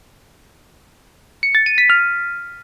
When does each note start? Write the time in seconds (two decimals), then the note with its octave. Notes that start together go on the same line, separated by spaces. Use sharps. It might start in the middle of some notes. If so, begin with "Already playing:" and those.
1.43 C#7
1.55 A6
1.66 D#7
1.78 B6
1.90 F6